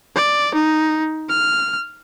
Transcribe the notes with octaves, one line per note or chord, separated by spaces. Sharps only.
D5
D#4
F6